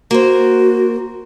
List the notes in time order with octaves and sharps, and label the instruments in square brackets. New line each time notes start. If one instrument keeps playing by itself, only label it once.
[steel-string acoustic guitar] A#3 C5 [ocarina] F#4